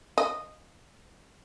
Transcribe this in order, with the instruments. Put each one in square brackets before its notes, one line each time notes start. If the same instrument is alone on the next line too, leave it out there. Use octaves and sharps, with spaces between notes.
[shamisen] D#5